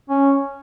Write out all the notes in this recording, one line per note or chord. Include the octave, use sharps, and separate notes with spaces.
C#4